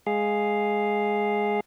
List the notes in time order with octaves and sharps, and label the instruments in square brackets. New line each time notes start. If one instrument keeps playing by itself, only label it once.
[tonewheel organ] G#3 G#4 F5